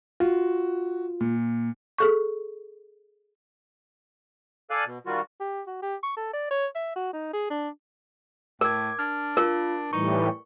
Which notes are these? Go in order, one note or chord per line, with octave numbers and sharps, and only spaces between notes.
F4 F#4
A#2
G#4 A4 C#6
A4 D5 F5 G#5 F#6
B2
D#3 G3 F4 F#4
G4
F#4
G4
C#6
A4
D5
C#5
E5
F#4
D#4
G#4
D4
A2 A#4 D6 G#6
D4 F6
F4 A#4
A2 E3 G3 D#4 C#6